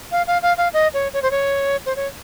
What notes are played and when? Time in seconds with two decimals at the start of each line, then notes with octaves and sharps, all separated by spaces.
0.12 F5
0.27 F5
0.42 F5
0.58 F5
0.73 D#5
0.94 C#5
1.14 C#5
1.23 C5
1.31 C#5
1.86 C5
1.96 C#5